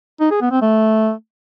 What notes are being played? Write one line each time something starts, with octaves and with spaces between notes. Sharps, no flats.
D#4
G#4
B3
C4
A3